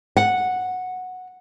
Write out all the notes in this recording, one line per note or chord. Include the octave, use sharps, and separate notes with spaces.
F#5